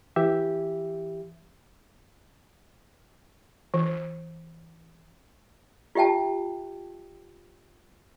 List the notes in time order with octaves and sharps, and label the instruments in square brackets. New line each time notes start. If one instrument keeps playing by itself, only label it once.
[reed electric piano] E3 G4 E5
[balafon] E3
[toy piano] F4 G4 E5 G5 A5